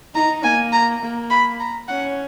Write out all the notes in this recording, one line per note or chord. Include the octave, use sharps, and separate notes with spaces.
D#4 A#5
A#3 G#5
A#5
A#3
B5
A#5
C#4 F#5